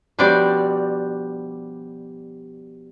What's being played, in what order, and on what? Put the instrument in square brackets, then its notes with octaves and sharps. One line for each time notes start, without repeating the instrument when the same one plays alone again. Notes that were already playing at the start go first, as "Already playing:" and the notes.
[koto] B2 F3 G3 D4 D5